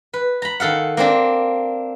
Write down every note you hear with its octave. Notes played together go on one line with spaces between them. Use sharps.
B4
A#5 B5
D#3 A4 F5 F#5
A#3 C4 D4